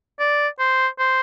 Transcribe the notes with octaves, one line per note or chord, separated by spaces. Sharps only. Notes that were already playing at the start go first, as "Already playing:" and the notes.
D5
C5
C5